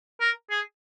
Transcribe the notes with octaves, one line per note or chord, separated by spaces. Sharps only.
A#4
G#4